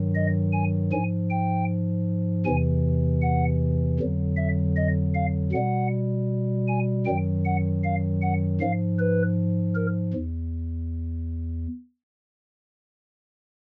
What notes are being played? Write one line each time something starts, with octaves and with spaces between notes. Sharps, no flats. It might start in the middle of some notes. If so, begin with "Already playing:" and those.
Already playing: G2 D#3 F#3
D#5
G#5
G#2 F3 G#5
G5
E2 C3 E3 G#5
F#5
F2 D3 F#3
E5
D#5
F5
B2 G3 F#5
G#5
F#2 D#3 F#3 G5
F#5
F5
F#5
G#2 F3 F5
B4
A#4
E2